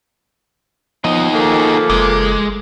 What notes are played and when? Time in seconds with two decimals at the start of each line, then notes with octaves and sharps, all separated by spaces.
1.05 D#2 F3 B3 D#4 D#5
1.34 F3 A3 A#3 F#4 G#4
1.90 F#1 G#3 D6